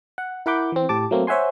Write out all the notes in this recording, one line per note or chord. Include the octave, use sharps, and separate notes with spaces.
F#5
E4 A#4 F#5 B5 D6 G6
E3 C4
A2 G4 A5 D6
F#3 A3 A#3 C4
C5 C#5 E5 F#5 G#5 C6